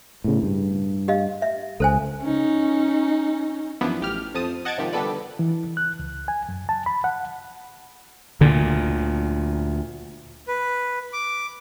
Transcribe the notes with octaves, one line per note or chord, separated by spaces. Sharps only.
A2 C#3
G2
G4 D#5 F5
E5
C#2 A4 C5 G#5
C#4 D#4
F#2 E3 F3 B3 D4 E4
A1 G4 F6
F2 F3 A5 D#6
D#5 F#5 A5 G#6 A6 D7
G#2 C3 D#3 F3 G4
D3 G3 B3 A4 B4 D5
E3
F#6
C#2
G#5
F#2
A5
B5
F#5
D2 A#2 D3
B4
D6